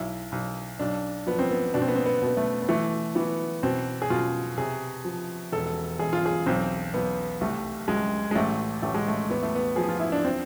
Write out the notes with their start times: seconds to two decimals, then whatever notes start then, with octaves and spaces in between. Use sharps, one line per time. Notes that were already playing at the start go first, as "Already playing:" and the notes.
Already playing: B1 E4
0.32 B1
0.79 B1 D4
1.27 F3 B3
1.39 C4
1.51 B3
1.74 B2 D4
1.82 C4
1.88 B3
1.95 C4
2.06 B3
2.22 B2
2.27 B3
2.37 A3
2.62 B3
2.69 E3 A3
3.15 E3 B3
3.63 B2 C4
4.02 G#4
4.10 B2 F4
4.57 C3 G#4
5.04 F3
5.52 E1 A4
5.99 E1 G#4
6.13 F4
6.26 G#4
6.46 B1 C4
6.94 B1 B3
7.41 C2 A3
7.88 C2 G#3
8.31 G#3
8.35 A1 A3
8.82 A1 A3
8.94 G#3
9.08 A3
9.30 E2 B3
9.43 A3
9.55 B3
9.76 F3 G#4
9.89 F4
10.00 E4
10.12 D4
10.25 C4